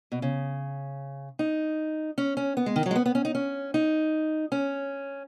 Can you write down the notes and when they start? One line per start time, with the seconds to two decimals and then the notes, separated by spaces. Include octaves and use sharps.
0.12 B2
0.22 C#3
1.39 D#4
2.18 C#4
2.37 C#4
2.57 B3
2.66 G#3
2.76 D#3
2.86 F#3
2.91 G#3
2.95 B3
3.06 B3
3.15 C#4
3.25 D#4
3.35 C#4
3.74 D#4
4.52 C#4